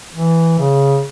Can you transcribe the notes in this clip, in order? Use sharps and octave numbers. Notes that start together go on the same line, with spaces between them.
E3
C#3